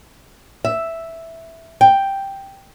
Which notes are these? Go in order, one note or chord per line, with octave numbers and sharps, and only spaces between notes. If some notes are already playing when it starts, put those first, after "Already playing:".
E5
G5